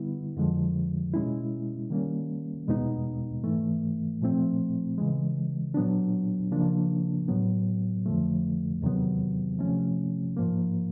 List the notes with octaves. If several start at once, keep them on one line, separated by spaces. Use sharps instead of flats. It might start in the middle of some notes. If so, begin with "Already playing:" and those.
Already playing: D3 G3 B3 E4
F2 D3 F3 G#3
B2 G#3 C#4 E4
D#3 G3 A#3 C#4
E2 B2 G#3 B3 D#4
G#2 E3 A3
A#2 F3 A3 C4
C#3 E3 G#3
A#2 F#3 B3 D4
C#3 F3 A#3 D4
A2 F#3 B3
F2 D3 F3 A3
E2 C3 D#3 F#3 B3
C3 F3 A3 C#4
G#2 F3 A#3